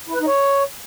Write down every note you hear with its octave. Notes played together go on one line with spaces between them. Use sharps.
E4
B4
D#4
C#5